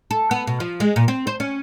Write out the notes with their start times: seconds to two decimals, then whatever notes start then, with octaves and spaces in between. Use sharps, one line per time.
0.11 A4
0.31 B3
0.47 B2
0.60 F3
0.80 G#3
0.96 A#2
1.08 C4
1.27 C5
1.40 C#4